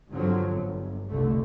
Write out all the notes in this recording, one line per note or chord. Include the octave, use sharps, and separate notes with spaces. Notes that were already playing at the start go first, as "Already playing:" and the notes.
G2 D3 F3 F#3 C4
G1
F1 C2 D3 A3